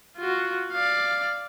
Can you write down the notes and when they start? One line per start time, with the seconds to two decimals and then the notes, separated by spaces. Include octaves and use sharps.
0.17 F4 F#4
0.72 D5 F5